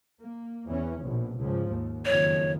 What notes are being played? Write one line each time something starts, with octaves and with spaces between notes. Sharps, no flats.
A#3
E2 E3 C#4
A#1 B2
C#2 G#2 F3
D#2
F#1 F2 D#3 C#5